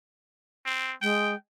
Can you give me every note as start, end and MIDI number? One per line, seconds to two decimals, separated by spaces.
0.66 0.94 60
1.02 1.34 56
1.02 1.35 79